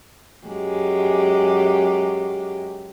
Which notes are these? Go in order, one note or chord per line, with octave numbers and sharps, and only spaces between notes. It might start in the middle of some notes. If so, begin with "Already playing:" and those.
F#2 G#3 G4